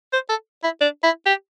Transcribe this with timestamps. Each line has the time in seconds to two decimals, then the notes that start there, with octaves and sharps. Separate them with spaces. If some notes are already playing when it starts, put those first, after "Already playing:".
0.13 C5
0.30 A4
0.64 E4
0.81 D4
1.03 E4
1.26 G4